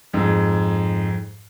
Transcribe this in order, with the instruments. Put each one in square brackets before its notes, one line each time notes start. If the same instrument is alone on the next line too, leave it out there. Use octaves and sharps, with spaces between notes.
[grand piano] F2 G#2